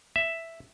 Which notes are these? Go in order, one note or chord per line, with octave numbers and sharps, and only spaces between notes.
E5